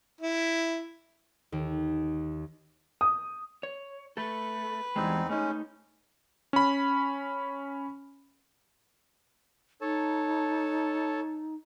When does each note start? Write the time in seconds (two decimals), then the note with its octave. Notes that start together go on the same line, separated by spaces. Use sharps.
0.21 E4
1.52 D#2
3.01 D#6
3.63 C#5
4.17 A3 A4 B4
4.96 E2 E3 G3 G#3 C4 D#4
5.29 G#3 A3 C#4 D#4
6.53 C#4 B5
9.81 D#4 A4 C#5 A5